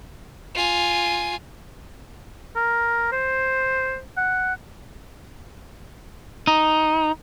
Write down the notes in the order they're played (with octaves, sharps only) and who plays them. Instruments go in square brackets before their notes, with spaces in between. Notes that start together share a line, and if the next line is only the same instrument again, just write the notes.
[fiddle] F4 G#5
[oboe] A#4
C5
F#5
[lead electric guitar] D#4